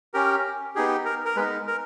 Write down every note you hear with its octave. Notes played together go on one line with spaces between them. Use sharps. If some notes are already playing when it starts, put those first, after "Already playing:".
C#4 G4 A#4
B3 D#4 G4 G#4
A#4
A#4
G#3 B3 D#4 B4
A#4